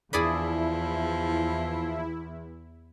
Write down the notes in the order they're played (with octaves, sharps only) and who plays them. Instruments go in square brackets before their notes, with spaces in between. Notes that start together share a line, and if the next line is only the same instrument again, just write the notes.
[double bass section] E2 [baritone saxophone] F3 [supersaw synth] E4 [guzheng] G#4 D5 B5